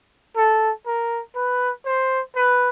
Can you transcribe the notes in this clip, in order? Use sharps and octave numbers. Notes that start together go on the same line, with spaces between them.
A4
A#4
B4
C5
B4